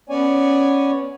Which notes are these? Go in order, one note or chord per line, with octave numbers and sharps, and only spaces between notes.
B3 C#4 C#5 D5 G#5